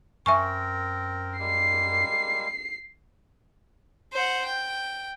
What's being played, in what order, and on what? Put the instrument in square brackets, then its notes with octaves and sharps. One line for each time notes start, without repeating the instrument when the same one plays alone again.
[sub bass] F#2 [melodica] C4 A#4 [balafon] E5 G#5 C#6
[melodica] G3 G#3 A#3 [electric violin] C7
[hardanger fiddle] C5 F#5
G5